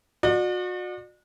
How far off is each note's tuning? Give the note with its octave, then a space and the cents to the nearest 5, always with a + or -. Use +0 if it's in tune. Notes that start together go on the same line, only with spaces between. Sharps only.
F#4 -35 D5 +40